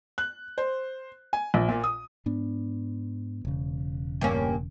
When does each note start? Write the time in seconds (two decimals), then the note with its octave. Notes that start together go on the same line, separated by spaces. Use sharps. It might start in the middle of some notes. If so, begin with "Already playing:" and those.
0.18 F#6
0.58 C5
1.33 G#5
1.54 A#1
1.68 A#2
1.84 D#6
2.26 G#2 B3 D4
3.45 E1 C#3
4.21 G2 A#3 C#4